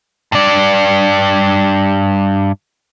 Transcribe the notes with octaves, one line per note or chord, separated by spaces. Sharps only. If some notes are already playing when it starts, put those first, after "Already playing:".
G2 D5